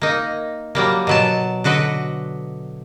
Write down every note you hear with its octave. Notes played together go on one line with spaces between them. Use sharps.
A#3 D#4
F#3 G3 A#3
B2 F#3 A5
D3 F#4 B4 D#5